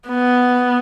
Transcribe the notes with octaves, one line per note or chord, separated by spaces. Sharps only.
B3